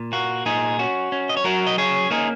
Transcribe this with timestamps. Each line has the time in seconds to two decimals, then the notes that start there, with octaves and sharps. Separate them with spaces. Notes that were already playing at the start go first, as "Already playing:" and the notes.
Already playing: A#2
0.13 A#3 F#4
0.46 A#2 D#4 G#4
0.79 C#4 F#4
1.12 C#4
1.29 D#5
1.37 C#5
1.44 F#3 F#4 A#4
1.67 D#5
1.78 C#4 G#4 C#5
2.11 A#3 D#4 G#4